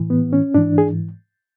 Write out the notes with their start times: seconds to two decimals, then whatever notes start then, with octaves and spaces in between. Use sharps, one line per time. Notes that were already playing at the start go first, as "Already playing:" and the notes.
Already playing: A2 E3
0.10 B3
0.33 C#4
0.54 G#2 E3 D4
0.78 G#4